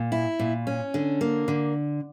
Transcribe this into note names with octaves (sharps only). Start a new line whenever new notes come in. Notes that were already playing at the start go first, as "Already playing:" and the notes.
Already playing: A#2
E4
A#2
C#4
D3
A#3
D3